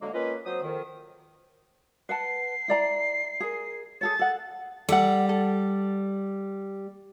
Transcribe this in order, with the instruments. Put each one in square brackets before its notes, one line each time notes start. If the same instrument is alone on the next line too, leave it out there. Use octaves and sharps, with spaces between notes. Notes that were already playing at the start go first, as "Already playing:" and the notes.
[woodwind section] D3 F#3 G#3 A#3
A#3 C#4 F4 B4 D#5
F#3 C4 C5 D#6
F2 D#3
[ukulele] B4 F#5 A5 [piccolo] C7
[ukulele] E4 D5 A#5
G#4 A#4
[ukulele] G#4 A4 C#5 [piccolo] A6
[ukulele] A4 F#5
[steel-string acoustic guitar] G3 [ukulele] A4 F#5
[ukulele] A4